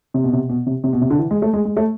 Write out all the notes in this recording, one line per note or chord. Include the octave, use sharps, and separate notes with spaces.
C3
B2
C3
B2
C3
C3
B2
C3
D3
E3
G#3
A3
G#3
G#3
A3